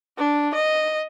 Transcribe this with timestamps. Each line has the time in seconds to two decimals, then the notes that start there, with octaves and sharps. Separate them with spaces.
0.17 D4
0.55 D#5